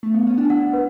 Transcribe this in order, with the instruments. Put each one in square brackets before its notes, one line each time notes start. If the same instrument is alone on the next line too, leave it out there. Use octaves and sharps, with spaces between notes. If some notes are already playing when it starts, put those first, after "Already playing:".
[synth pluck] A3
B3
C#4
D4
[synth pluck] E4 [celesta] F#5
[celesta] B4